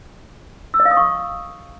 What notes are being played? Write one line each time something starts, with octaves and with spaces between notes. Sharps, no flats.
E6
D#5
F5
D#6
C#6